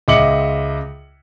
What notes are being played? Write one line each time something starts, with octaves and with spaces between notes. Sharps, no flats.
C#2 D#5 E5 D6 C#7 F#7